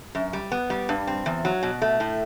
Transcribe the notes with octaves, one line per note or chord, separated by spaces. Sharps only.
F#2
G3
B3
G3
G2
C4
E2
F#3
B2
A3
A2